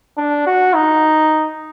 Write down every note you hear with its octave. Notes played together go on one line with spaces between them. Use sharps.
D4
F#4
D#4